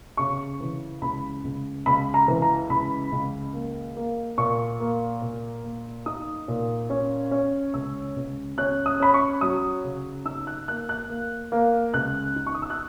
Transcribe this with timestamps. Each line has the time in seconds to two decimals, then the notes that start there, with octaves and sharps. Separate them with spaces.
0.17 C#3 C#6
0.60 E3
1.02 C#2 B5
1.44 C#2
1.86 C#2 B5
2.14 A#5
2.28 E3
2.42 A#5
2.70 C#2 B5
3.12 C#2
3.54 A#3
3.96 A#3
4.38 A#2 C#6
4.80 A#3
5.22 A#2
5.64 A#3
6.06 D#4 D#6
6.48 A#2
6.90 C#4
7.31 C#4
7.74 C#2 E6
8.16 C#2
8.58 C#4 F#6
8.86 D#6
9.00 C#4 B5
9.14 C#6
9.41 F#3 D#6
9.84 C#3
10.25 D#4 E6
10.47 F#6
10.68 A#3 F#6
10.89 F#6
11.09 A#3
11.52 A#3
11.94 C#2 F#6
12.36 D#4
12.47 C#6
12.55 D#6
12.62 E6
12.70 F#6